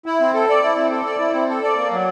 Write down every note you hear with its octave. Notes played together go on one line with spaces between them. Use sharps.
E4
C4
A4
D5
E4
C4
A4
D5
E4
C4
A4
D5
A#3
F#3